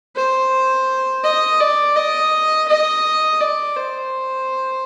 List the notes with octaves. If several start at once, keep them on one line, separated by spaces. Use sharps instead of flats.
C5
D#5
D5
D#5
D#5
D5
C5